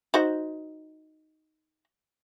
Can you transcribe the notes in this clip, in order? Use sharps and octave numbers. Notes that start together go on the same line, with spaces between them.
D#4 F#4 C5